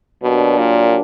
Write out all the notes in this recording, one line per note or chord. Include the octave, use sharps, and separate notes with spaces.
B2 F#3 A#3 D4 G4
A#2